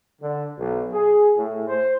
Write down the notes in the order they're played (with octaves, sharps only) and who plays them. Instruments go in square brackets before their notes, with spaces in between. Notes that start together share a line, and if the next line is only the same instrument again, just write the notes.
[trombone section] D3
B1
G#4
A2
C5